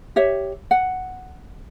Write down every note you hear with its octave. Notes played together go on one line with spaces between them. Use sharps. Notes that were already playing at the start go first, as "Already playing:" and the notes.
G4 C#5 E5
F#5